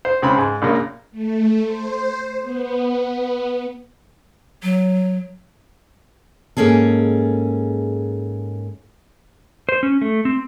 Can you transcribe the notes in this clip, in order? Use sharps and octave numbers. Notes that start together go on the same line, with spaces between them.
C5
C#2 C#3 C4 B5 C6
G#2
A#1 F#2 C#3 A#3
A3
C5
B3
F#3
G#2 A#3 C#4 G#4 A4
C5
C#4
A3
C4